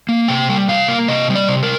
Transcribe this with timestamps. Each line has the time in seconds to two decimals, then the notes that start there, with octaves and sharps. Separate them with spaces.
0.09 A#3
0.28 C3 G5
0.49 G3
0.68 C3 F5
0.88 A#3
1.08 C3 D#5
1.29 G3
1.35 D5
1.48 C3
1.63 A#4